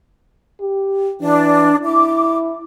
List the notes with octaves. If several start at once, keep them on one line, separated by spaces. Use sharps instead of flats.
G4
E3 D4
E4 D6